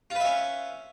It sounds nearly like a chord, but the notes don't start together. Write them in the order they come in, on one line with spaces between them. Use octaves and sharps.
F4 B4 E5 C#4